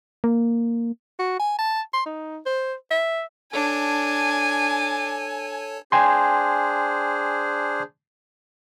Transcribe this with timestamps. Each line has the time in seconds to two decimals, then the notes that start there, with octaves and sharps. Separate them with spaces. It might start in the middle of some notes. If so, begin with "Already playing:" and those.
0.24 A#3
1.19 F#4
1.39 G#5
1.59 A5
1.94 C6
2.06 D#4
2.46 C5
2.91 E5
3.53 D4 A4 C#5 G#5 A5
5.92 D4 G#4 C5 G5 G#5 C6